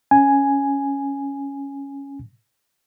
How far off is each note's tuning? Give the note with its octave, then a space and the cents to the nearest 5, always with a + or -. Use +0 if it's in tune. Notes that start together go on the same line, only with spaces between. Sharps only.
C#4 +0 G#5 +0